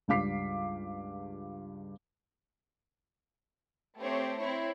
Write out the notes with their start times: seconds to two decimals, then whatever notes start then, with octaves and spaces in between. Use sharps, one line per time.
0.08 C#2 G2 F5 D6 B6 C7
3.99 A3 C4 G4 C#5
4.38 C4 E4 C#5